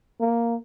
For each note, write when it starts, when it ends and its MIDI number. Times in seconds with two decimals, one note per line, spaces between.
0.20 0.55 58